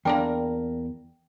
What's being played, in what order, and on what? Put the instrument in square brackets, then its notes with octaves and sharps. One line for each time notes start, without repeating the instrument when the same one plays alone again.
[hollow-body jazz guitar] E2 [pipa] A#3 D4 A#4 [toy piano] G5